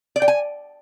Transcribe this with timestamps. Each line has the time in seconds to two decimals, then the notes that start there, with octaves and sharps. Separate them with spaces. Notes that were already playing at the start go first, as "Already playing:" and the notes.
0.16 D5
0.22 G5
0.28 G#5